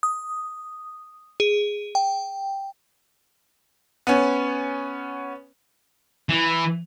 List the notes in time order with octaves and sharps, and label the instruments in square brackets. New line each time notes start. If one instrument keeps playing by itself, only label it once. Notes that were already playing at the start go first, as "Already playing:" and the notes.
[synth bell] D#6
G#4
G5
[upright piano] B3 C#4
[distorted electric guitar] E3